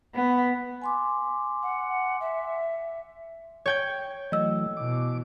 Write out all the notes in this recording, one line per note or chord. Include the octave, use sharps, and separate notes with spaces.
B3
G#5 C6 D6
F#5
E5
C#5 G5 G#6
E3 F#3 A3 D#5 E6
B2 E3 D6